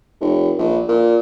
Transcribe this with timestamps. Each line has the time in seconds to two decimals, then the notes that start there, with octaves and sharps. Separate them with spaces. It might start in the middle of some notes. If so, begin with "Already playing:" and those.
0.20 F1
0.58 A#1
0.88 A#2